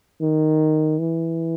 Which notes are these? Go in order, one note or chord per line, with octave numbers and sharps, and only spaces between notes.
D#3
E3